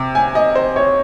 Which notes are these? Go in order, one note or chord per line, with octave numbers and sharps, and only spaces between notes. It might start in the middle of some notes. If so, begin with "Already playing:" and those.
Already playing: C3
G#5
D#5
C5
C#5